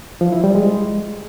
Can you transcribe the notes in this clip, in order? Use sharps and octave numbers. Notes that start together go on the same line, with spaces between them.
F3
E4
G3
G#3